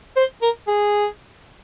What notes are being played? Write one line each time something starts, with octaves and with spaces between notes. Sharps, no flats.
C5
A#4
G#4